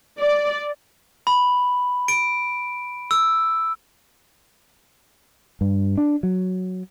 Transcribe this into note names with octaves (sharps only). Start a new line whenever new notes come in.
D5
B5
D7
E6
G2
D4
F#3